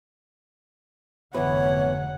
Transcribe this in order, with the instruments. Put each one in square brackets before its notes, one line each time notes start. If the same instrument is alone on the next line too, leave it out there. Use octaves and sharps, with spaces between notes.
[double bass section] F1 G#2 D3 [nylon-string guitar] E2 B4 [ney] C#5 [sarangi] F#5